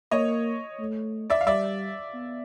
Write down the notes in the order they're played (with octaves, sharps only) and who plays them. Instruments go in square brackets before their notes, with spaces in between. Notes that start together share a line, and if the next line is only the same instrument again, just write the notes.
[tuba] A#3 [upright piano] C#5 D#5
[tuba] A3
[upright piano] D5 E5
F5
[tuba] G3 [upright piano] D5 E5
[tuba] B3